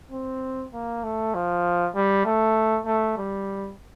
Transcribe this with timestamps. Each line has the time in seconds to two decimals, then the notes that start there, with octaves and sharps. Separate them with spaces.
0.12 C4
0.73 A#3
1.03 A3
1.34 F3
1.95 G3
2.26 A3
2.86 A3
3.17 G3